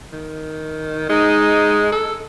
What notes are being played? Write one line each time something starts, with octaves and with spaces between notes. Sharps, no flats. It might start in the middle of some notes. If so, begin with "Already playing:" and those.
D#3
G#3 D#4
A4